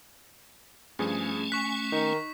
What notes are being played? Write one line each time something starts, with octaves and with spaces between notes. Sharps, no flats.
G2 F3 A3 C#4 G#4 G#5
C#6 F#6 B6
D#3 D#4